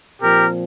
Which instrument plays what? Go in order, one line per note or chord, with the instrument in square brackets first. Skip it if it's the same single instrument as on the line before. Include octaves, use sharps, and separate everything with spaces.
[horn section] A#2 F3 C4 G4 A#4